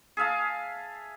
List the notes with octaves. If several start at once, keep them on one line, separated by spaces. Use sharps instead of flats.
G#4 E5 F5 A5